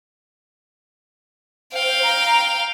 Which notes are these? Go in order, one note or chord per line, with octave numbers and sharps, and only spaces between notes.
C5 F5 G5
A#5